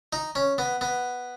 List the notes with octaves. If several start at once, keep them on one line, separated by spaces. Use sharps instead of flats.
D#4
C#4
B3
B3